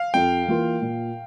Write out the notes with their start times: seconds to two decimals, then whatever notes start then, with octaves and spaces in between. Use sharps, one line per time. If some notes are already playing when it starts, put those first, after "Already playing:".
Already playing: F5
0.14 F2 G5
0.48 E3 A#3 F4
0.81 A#2